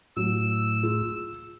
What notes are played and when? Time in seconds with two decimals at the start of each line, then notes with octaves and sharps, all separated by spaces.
0.17 A2 F#3 E6
0.83 F4 G#4